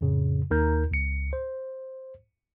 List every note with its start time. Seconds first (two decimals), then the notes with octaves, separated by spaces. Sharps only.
0.01 F2 A2 C#3
0.51 D#2 D#4 A#4 A#5 G6
0.91 C#2 C#7
1.33 C5